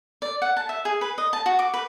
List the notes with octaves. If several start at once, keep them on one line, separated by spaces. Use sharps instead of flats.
D5
F#5
A5
E5
G#4
B4
D#5
A5
F#4
D6
B4